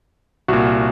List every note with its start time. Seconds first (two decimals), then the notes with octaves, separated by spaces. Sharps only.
0.48 C2 A#2 F#4